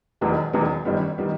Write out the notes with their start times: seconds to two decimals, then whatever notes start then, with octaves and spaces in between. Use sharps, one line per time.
0.21 E1 E2 D#3 F#3 B3
0.53 E1 E2 D#3 F#3 B3
0.85 G1 F#2 D#3 G3 B3
1.17 D#3 G3 B3